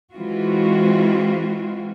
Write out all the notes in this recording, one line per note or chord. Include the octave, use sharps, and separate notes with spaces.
E3 G#3 C4 F4 F#4